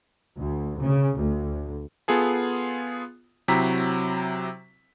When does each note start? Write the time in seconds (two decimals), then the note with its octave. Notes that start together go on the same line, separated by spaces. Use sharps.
0.37 D2
0.82 C#3
1.18 D2
2.08 B3 F4 G#4 A4
3.48 C3 F#3 C4 E4 A#5 B6